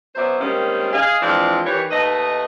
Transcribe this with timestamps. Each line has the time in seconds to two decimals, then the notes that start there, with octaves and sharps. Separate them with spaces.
0.15 F#3 B3 C#4 C5 D5 E5
0.40 D#3 G3 G#3 A#3 C4 C#4
0.93 G#4 D#5 F5
1.21 E3 F3 G#3 C4 D4 F4
1.65 D#3 E3 G3 G4 C#5
1.90 D#2 A3 D#4 B4 D#5